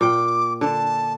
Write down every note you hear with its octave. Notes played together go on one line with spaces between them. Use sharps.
A#2 G5 D6
D3 A5